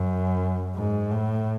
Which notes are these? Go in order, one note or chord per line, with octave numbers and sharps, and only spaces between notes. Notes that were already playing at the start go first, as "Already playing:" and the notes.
Already playing: F#2
G#2
A2